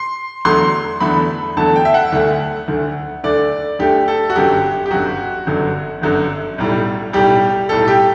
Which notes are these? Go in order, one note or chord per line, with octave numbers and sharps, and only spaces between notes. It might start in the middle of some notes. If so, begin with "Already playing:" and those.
Already playing: C6
E2 D3 F#3 A3 C6
E2 D3 F#3 A3 B5
E2 D3 F#3 A3 A5
G5
E5
F#5
D2 D3 A3
D2 D3 A3
D2 D3 A3 D5
D2 D3 A3 G4
A4
F#4
G1 F#2 D3 F#3 G4
G4
G1 F#2 D3 F#3 F#4
G1 F#2 D3 F#3
G1 F#2 D3 F#3
B1 A2 G3
B1 A2 G3 G4
B1 A2 G3 A4
G4